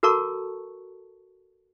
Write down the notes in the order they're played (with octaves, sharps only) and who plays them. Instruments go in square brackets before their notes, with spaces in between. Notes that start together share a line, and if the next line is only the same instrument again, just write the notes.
[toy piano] F#4 A4 A#4 A5 A#5 C#6